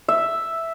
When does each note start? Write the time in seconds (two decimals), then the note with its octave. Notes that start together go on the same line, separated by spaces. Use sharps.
0.08 E5